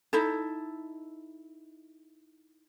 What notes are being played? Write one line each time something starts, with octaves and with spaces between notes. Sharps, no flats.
D#4 E4 A4